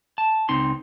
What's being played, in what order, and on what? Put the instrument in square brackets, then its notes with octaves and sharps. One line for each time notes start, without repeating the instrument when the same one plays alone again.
[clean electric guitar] A5
C#2 C4 D#4 C6